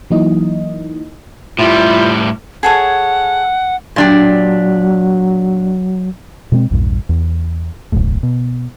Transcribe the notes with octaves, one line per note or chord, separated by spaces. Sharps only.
E3 F#3 A#3 D#4 E4 D#5
A2 G3 E4 F4 G4
G#4 A4 C#5 F#5
A#2 F#3 D4 G4
B2 G#3 A3 C4
A#1 E2 G2 A#2
E2
D1 B1 F#2 A2
B2